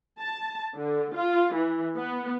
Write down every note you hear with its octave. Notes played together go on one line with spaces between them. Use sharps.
A5
D3
F4
E3
B3